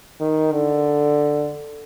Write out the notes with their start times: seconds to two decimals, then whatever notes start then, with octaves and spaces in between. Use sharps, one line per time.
0.21 D#3
0.52 D3